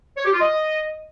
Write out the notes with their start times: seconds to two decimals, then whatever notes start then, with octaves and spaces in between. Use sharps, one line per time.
0.17 C#5
0.25 G4
0.33 F4
0.41 D#5